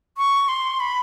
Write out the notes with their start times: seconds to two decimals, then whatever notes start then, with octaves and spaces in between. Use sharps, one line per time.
0.17 C#6
0.48 C6
0.80 B5